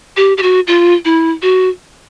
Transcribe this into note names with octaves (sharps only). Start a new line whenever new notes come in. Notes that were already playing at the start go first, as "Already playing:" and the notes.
G4
G4
F#4
F4
E4
F#4